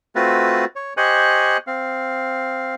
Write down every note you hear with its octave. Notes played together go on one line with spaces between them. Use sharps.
A3 C4 F4 F#4 B4
C#5
G4 C5 D#5 G#5 C#6 F#6
C4 F5